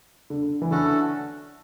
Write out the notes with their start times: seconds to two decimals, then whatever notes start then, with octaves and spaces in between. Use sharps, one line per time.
0.30 D3
0.62 E3
0.71 D3 A3 C#4 F#4 A4